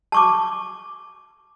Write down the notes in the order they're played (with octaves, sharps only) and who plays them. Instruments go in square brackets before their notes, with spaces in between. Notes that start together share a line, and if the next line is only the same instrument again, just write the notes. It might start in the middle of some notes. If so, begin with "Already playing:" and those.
[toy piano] A5 C#6 D6